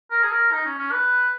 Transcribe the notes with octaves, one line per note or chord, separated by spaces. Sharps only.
A#4
G#4
A#4
D#4
C#4
C#4
B4